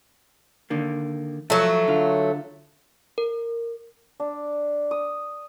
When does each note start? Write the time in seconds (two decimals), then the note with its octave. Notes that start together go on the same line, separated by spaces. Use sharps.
0.70 D3 D#3 A#3
1.50 F3 F#3 A3
1.88 D3 F4
3.18 A#4
4.20 D4
4.91 D#6